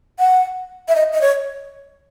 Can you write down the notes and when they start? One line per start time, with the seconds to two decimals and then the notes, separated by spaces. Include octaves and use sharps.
0.19 F#5
0.88 E5
0.96 D#5
1.13 D#5
1.21 C#5